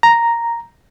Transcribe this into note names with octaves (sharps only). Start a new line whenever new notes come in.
A#5